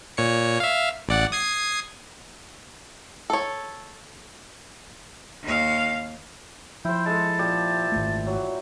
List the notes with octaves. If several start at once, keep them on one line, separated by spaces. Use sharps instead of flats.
A#2 C#5 C#7
E5 F5
A1 D5 F#5
D#6 G#6 C7
A4 C#5
D#2 F5
F3 E4 C5 G5
G#3 A4 A5
A#2 G4
G#1 A3
F#3